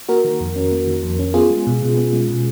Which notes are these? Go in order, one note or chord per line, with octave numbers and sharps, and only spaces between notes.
A#3 F#4 A#4
D#3
F2
C#4
A#3
D#3
F2
C#4
B3 F4 G#4
G#3
B2
B2
B3
G#3
B2